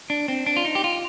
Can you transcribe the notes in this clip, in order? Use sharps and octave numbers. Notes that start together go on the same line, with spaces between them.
D4
C4
D4
F4
D#4
G4
F4